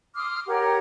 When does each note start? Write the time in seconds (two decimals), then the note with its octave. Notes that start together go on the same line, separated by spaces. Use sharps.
0.14 C6 D6 D#6 F6
0.47 G4 A#4 C#5 F#5